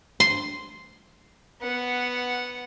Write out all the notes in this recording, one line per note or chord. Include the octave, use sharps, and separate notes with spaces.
C6
B3 F#5